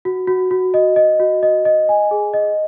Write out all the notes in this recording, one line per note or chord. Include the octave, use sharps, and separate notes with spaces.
F#4
F#4
F#4
D#5
D#5
F#4
D#5
D#5
G#5
G#4
D#5